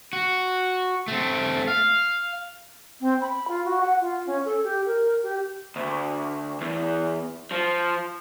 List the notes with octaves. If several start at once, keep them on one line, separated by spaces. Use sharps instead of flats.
F#4
A3 C4
F5
C4
B5
F4
F#4
F#5
F4
C#4
A4
G4
A#4
G4
D2
E2
F3